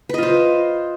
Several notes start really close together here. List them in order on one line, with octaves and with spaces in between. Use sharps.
B4 D#5 F4 C5